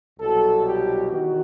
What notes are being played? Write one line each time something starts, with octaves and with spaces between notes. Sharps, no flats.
C2 B2 F#3 A4
G4
E2 D#3 F#4